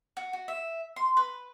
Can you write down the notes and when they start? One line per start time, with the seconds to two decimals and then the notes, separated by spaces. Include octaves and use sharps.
0.17 F#4
0.33 F#4
0.48 E5
0.96 C6
1.17 B4